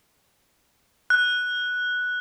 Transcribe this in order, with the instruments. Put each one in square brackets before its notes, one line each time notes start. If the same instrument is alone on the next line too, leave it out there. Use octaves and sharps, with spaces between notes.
[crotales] F#6